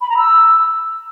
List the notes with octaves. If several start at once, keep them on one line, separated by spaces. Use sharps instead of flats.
B5
A#5
E6